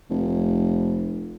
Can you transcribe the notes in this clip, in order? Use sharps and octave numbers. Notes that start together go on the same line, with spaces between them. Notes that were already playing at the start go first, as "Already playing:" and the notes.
F1